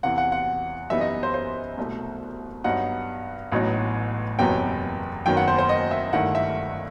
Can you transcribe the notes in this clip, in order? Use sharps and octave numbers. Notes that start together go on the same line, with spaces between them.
E2 C3 E3 F#5
F#5
F#5
F#2 E3 G3 B3 D#4 E5
D#5
C5
C5
C2 B2 A3
G2 F#3 B3 D#4 F#5
A1 A2 F#3 B3 D#4
F#1 E2 C3 F#3 B3 G5
F#1 F#2 D#3 F#3 B3 G5
F#5
C5
C5
D#5
E5
G1 G2 D#3 A3 E4 F#5
E5